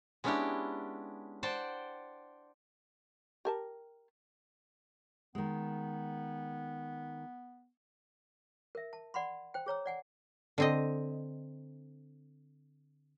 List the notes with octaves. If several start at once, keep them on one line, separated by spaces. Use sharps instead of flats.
G#3 B3 C#4 D4 E4 G4
C5 D5 F#5 G5 A5
G4 A#4 A5
D#3 G#3 B3
A#4 E5
A5
D5 F#5 B5 C6
C5 G5
G#4 C#5 A#5 E6
D5 F#5 G#5
D3 C4 D#5